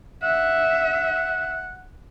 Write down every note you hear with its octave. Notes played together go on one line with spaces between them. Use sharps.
E5 F#5